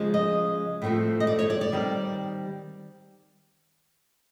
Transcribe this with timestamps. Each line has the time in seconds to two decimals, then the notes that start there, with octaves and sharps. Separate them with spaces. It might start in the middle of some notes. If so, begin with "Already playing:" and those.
Already playing: C#3 F3 G#3
0.14 D#5
0.82 A2 F3 A3 C4
1.20 D#5
1.27 D5
1.39 C#5
1.50 D5
1.61 D5
1.72 D#3 G3 C4